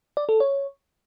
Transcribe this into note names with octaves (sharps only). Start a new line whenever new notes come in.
D5
A4
C#5